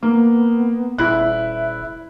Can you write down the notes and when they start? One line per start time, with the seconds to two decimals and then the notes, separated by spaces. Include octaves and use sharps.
0.03 A#3 B3
0.98 D#1 E4 E5 F#6